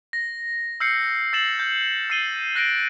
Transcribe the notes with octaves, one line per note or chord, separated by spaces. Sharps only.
A#6
E6 F6 G6 C7 C#7
E6 A6 C7 E7 F#7
G6
E6 A6 C7 D#7 F#7 G7
F#6 A#6 C7 D7 G7